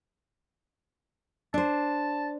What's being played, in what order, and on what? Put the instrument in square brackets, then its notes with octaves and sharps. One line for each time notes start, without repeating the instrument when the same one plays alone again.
[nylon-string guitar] D4 C5 [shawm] A5